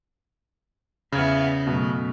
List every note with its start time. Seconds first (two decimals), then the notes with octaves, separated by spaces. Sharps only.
1.12 E2 C#3 B3 E5 F6 G#6
1.67 F#2 B2 A3